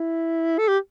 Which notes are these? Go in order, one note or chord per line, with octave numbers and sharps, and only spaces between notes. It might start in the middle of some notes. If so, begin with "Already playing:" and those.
Already playing: E4
A4
G4